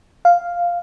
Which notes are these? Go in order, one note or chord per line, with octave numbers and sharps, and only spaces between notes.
F5